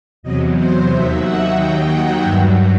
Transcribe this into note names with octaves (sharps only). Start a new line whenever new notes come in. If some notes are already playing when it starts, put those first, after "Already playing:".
E2 C3 F#3 D#5
C5
D#2 D#3 F#3 E5
F#5
D#2 D#3 F#3 G5
F#5
G2 F#3 E5